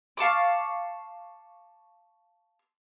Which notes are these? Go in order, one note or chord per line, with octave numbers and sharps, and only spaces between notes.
F5 A5 C#6 D6